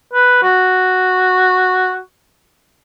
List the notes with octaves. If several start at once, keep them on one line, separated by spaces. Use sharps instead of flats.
B4
F#4